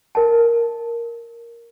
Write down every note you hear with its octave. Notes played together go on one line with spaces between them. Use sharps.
A#4 D#5 A5